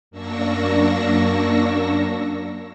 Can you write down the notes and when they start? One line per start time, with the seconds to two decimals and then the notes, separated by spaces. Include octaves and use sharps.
0.11 F#2 A#3 D4 C#6 E6 A#6